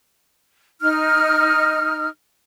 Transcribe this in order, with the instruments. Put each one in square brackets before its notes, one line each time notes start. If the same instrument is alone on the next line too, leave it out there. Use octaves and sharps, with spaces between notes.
[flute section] D#4 F6